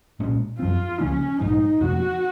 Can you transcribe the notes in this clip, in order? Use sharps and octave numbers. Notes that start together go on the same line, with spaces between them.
C2 A#2 G#3 C#4
F#2 F3 C4 F4
C#2 C#3 F3 A#3 C#4
A#1 G#2 F#3 D#4
F2 C3 F3 A#3 F#4